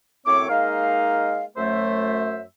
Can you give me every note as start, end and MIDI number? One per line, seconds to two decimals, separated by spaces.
0.26 0.48 42
0.26 0.48 45
0.26 0.48 60
0.26 0.48 73
0.26 0.48 86
0.49 1.44 56
0.49 1.44 58
0.49 1.44 63
0.49 1.44 75
0.49 1.44 77
1.57 2.41 42
1.57 2.41 57
1.57 2.41 72
1.57 2.41 76